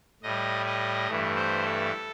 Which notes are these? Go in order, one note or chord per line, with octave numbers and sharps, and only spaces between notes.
A2 G3 D#5
D#5
G2 E3 A3
C5
A4